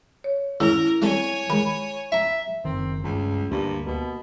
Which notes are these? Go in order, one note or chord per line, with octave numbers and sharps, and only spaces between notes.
C#5
G#2 D#3 C#4 E4 A#4
G3 A3 C4 C#5 G#5
D#3 G#3 B5
E5 A#5 C#6
F#1 C2 D#3 C4
C#2 G2
D2 G2 A#3
B2 A#3